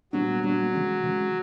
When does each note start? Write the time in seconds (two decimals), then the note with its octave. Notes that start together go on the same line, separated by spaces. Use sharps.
0.13 A#2 F#3 G3 B3 D4
0.43 A#2 F#3 G3 B3 D4
0.73 C3 E3 G#3 C#4
1.03 C3 E3 G#3 C#4